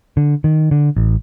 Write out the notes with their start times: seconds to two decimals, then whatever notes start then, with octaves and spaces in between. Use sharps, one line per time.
0.17 D3
0.44 D#3
0.71 D3
0.97 A1